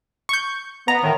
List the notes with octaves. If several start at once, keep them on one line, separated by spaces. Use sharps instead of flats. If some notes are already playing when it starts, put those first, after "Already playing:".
C#6 G6
B3 A#5
A2 D#3